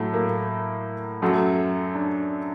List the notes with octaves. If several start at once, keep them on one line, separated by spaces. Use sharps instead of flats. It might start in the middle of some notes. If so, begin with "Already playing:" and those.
Already playing: A2 F#3 A3
A#3
F#2 F#3 A3
D4